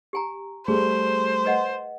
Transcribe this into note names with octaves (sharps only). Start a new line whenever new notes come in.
G4 G#5 A#5
G3 A3 G#4 C5
B4 D#5 F#5